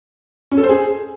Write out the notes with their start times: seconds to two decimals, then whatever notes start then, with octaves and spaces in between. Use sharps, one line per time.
0.51 C#4
0.57 A4
0.63 C5
0.69 G#4